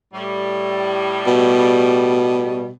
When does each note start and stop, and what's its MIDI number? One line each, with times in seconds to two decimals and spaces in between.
0.13 2.68 45
0.13 2.68 55
1.26 2.69 47